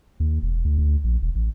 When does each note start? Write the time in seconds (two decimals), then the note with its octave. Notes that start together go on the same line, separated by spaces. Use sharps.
0.20 D#2
0.42 E1
0.65 D2
0.78 D2
1.04 A#1
1.22 E1
1.35 A1